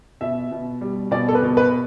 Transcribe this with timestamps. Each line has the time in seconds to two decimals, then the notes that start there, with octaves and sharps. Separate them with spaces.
0.21 B2 E5
0.51 B2
0.81 G3
1.11 B2 D5
1.28 A4
1.35 B4
1.42 B2
1.57 B4